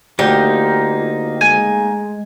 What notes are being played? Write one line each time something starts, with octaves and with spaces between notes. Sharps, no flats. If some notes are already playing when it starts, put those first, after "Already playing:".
D2 A#3 D#4 F4 G4
G#3 G#5